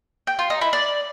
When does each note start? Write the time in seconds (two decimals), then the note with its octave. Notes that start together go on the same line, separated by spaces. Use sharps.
0.27 G5
0.39 F4
0.50 D#4
0.61 E4
0.73 D5